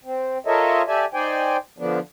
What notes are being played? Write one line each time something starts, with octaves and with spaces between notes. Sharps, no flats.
C4
F4 A4 A#4 C#5 D#5 E5
G4 A4 D5 E5 G#5
D#4 C5 D5 G5 G#5
D3 F3 B3 D4